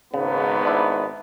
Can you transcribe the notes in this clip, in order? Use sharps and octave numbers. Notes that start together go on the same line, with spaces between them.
G#1 G#2 C#3 B3
D4 E4